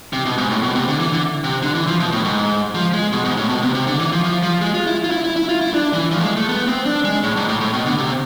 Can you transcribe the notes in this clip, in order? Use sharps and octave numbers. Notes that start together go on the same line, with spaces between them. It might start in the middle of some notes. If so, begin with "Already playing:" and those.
C3
B2
G#2
A2
B2
C3
D3
E3
D3
C3
D3
E3
F3
B2
A2
G#2
F3
G#3
B2
G#2
A2
B2
C3
C3
D3
E3
F3
F3
F3
G#3
F4
E4
F4
E4
E4
E4
F4
E4
D4
E3
F3
A3
G#3
A3
B3
C4
D4
G#3
A2
G#2
A2
A2
B2
D3
C3